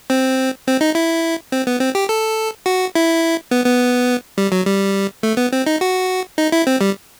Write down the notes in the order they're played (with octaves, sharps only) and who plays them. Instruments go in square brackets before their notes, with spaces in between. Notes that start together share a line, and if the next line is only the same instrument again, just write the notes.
[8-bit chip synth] C4
C4
D#4
E4
C4
B3
C4
G4
A4
F#4
E4
B3
B3
G3
F#3
G3
A3
B3
C4
D#4
F#4
D#4
E4
C4
G3